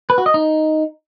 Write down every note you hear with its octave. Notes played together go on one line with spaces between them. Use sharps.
B4
F#4
D#5
D#4